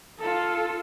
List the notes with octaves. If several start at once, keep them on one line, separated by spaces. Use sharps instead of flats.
F4 A4